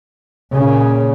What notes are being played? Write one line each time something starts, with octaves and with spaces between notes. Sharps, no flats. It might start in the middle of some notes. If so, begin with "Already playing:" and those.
A#2 C#3